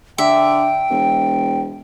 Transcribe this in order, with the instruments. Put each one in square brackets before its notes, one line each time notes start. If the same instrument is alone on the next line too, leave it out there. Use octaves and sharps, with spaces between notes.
[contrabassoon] D3 [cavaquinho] E5 [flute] G5
[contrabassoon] E1